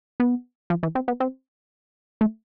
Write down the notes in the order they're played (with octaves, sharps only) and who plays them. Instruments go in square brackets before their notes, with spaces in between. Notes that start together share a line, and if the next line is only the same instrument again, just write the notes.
[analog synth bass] B3
F3
E3
C4
B3
C4
A3